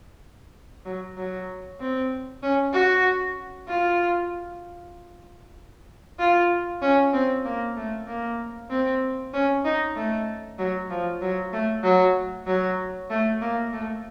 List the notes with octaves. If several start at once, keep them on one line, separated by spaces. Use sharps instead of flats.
F#3
F#3
C4
C#4
F#4
F4
F4
C#4
C4
A#3
A3
A#3
C4
C#4
D#4
A3
F#3
F3
F#3
A3
F#3
F#3
A3
A#3
A3